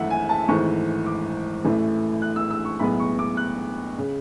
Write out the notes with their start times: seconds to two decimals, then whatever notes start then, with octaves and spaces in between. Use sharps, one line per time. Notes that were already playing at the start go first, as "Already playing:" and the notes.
Already playing: G#1 F#2 E3 A3 E5 F#5
0.10 G#5
0.29 A5
0.48 G#1 G#2 E3 A3 C#6
1.06 D6
1.65 A1 A2 E3 A3
2.22 F#6
2.36 E6
2.51 E6
2.65 C#6
2.79 B1 A2 G#3 B3 B5
3.00 C#6
3.19 D6
3.37 F#6
3.98 C#3